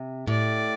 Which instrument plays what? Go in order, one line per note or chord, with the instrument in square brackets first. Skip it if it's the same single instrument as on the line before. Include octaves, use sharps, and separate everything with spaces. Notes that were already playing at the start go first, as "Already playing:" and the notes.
Already playing: [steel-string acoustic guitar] C3
[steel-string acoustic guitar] A2 [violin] D5